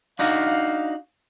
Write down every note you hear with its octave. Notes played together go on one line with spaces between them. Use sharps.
D4 D#4 F#4 F5